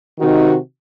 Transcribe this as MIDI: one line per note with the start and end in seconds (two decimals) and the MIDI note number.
0.19 0.55 48
0.19 0.55 51
0.19 0.55 63
0.19 0.55 66